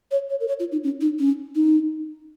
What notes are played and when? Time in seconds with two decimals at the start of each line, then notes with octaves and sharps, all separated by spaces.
0.11 C#5
0.30 C#5
0.40 A#4
0.48 C#5
0.60 F4
0.72 D#4
0.84 C#4
1.01 D#4
1.19 C#4
1.55 D#4